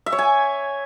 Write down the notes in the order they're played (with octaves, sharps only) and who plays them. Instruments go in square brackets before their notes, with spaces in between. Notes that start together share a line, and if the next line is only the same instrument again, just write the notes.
[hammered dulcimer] E5
C#5
G#5